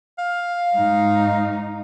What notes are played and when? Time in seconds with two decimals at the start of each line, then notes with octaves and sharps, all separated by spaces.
0.19 F5
0.76 G#2 D#4